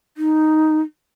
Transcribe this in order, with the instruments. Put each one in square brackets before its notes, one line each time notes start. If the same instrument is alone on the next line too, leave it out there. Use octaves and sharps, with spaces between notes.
[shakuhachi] D#4